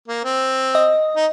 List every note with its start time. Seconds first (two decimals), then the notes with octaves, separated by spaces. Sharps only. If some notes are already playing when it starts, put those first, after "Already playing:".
0.08 A#3
0.24 C4
0.75 D#5
1.16 D#4